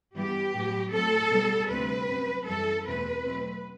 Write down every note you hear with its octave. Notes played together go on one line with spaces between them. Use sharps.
G2 E3 G3 B3 G4
A2 F#3 B3
A2 F#3 C4 A4
B2 G3 B3
D2 C3 G3 C4 B4
F#2 F#3 C4
F#2 E3 G3 A4
E2 B2 A3 C4 B4
B2 F#3 A3 C4